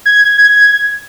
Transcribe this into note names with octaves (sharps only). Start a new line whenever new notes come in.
G#6